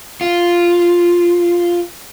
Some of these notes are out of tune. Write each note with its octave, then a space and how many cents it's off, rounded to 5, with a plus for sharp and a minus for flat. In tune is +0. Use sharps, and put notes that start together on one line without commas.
F4 -5